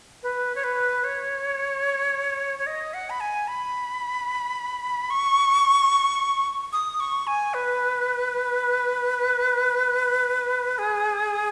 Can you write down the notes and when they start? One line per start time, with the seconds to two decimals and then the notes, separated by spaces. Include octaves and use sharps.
0.23 B4
0.55 C#5
0.64 B4
1.04 C#5
2.59 C#5
2.67 D#5
2.94 F#5
3.10 B5
3.20 G#5
3.48 B5
5.10 C#6
6.73 D#6
7.00 C#6
7.27 G#5
7.54 B4
10.78 G#4